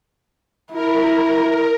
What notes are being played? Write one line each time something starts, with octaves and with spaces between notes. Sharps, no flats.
E4 A#4